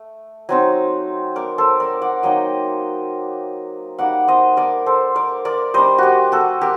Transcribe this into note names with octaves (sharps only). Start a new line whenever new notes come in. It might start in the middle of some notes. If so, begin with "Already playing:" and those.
Already playing: A3
F#3 C4 D#4
A#4 D5
A4 C5
A#4 D5
D5 F#5
F#3 A#3 D#4 D#5 G5
G3 A#3 D#4 D5 F#5
C5 D#5
A#4 D5
A4 C5
A#4 D5
A#4 D5
G3 D4 C5 D#5
F#4 G4
F#4 A4
G4 A#4